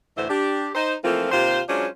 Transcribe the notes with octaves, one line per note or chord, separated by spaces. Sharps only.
D2 A2 D3 E3 C5 E5
D4 G4
D#4 C5
E3 F3 A3 A#3 C4 F4
D#2 C3 F4 C5
F#3 G#3 C#4 D4 F4 C5